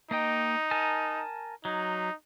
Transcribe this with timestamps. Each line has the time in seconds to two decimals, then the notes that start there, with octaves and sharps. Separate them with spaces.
0.11 A#3 D#4 D#5 G5
0.71 A#4 G#5 A5
1.65 F#3 D#4